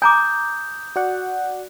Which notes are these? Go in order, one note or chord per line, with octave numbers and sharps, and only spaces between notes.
G#5 A#5 D6 D#6 G6
F#4 D5 F#5